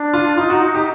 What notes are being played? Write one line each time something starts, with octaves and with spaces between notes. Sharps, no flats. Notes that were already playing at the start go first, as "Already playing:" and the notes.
Already playing: D4
F4
D#4 F4
F#4
G4